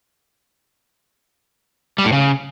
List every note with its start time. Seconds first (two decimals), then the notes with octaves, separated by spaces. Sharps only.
1.98 G3
2.05 A2
2.12 C#3